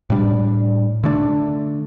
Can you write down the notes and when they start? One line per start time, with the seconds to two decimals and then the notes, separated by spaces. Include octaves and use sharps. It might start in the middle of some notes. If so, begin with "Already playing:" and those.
0.10 A2 G3 D4
1.04 D3 A3 D4